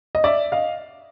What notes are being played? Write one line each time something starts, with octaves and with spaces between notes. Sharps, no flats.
D#5
D5 E5
D#5 F5